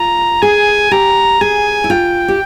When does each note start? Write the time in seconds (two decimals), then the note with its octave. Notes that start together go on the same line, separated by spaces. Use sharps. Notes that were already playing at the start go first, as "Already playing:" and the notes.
Already playing: F4 A#5
0.42 G#4 G#5
0.91 G4 A#5
1.41 G#4 G#5
1.84 E4
1.90 F4 G5
2.28 G4